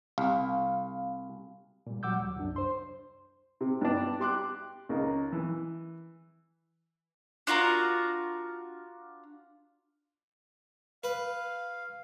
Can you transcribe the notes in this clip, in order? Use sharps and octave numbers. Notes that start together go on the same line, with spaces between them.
C2 F5
A#2 G3
F#3 G3 F#5 D6 E6 G6
D#2
C2 F#2 D4
C5 C6
C3
G2 B3 D4
G4 C6 D6 F#6
C#2 A#3 D#4
E3
D4 F4 F#4 A#4
B4 F5